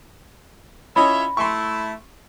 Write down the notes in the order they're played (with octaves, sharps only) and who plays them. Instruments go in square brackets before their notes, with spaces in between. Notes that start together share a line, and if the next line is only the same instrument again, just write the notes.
[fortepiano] C#4 E4 D#5 [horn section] F4 C#5 E5 [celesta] B5
[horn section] A3 E4 [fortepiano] C6 C#6